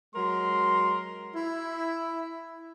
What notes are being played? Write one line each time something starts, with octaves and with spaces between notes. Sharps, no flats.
F#3 G#3 A#4 C6
E4